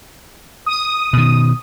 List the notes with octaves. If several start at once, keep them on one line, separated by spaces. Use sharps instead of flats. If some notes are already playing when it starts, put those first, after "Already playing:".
D#6
B2 D#3